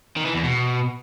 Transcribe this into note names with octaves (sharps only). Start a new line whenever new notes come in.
D#3
E3
E2
B2